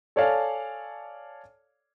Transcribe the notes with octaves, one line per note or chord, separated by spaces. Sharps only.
A4 C#5 D5 F5 G#5 A5